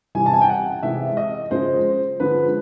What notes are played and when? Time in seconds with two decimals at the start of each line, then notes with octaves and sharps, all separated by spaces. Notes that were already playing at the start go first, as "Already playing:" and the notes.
0.15 C3 E3 G3 G#5
0.26 A5
0.34 G#5
0.41 G5
0.49 F#5
0.83 C3 E3 G#3 E5
1.17 D#5
1.51 C#3 F3 G#3 C5
2.20 D3 F3 G#3 B4